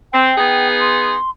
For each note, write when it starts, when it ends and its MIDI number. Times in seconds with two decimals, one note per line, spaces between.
0.13 0.32 60
0.13 0.68 79
0.37 1.15 59
0.37 1.15 63
0.37 1.15 68
0.81 1.30 84